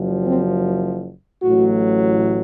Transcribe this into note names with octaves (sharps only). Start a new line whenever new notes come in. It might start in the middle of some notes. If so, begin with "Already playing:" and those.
Already playing: F#1 F#2 F3
C4
A1 A2 F#3 F#4